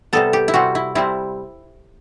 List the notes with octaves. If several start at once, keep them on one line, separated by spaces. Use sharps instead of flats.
C3 G3 B3 A4
G4
E4
C3 G3 C4 F#4
E4
C3 G3 C4 E4